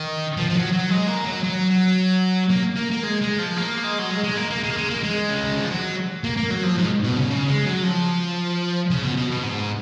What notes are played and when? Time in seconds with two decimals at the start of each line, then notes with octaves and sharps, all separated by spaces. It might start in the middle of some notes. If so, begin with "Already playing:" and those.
Already playing: D#3
0.37 F3
0.49 F3
0.55 F#3
0.73 F#3
0.90 G#3
1.08 A#3
1.26 F#3
1.44 F#3
1.71 F#3
2.50 A#3
2.76 A#3
2.91 A#3
3.03 G#3
3.22 G#3
3.39 F3
3.57 A#3
3.84 G#3
3.99 F#3
4.10 G#3
4.24 G#3
4.37 A#3
4.51 A#3
4.63 G#3
4.70 A#3
4.77 G#3
4.90 A#3
5.03 G#3
5.30 C#3
5.43 D#3
5.57 F3
5.70 F#3
6.24 A#3
6.37 A#3
6.50 F#3
6.63 F3
6.77 G#2
7.04 B2
7.17 C#3
7.30 C#3
7.48 G#3
7.66 F#3
7.84 F3
8.90 C#3
9.03 B2
9.17 B2
9.30 B2
9.43 G#2